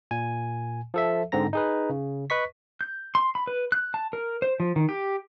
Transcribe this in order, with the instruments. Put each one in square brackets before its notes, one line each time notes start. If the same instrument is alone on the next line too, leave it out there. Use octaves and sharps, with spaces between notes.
[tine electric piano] A#2 G#5
F3 A4 E5
G#2 D3 C4 A#5 A#6
D#4 G#4 B4
C#3
B4 D#5 C#6 B6
[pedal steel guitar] G6
C6
B5
B4
F#6
A5
A#4
C5
F3
D#3
G4